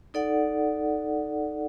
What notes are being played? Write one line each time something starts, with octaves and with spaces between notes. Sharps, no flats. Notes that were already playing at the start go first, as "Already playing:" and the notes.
D#4 A4 D5 F#5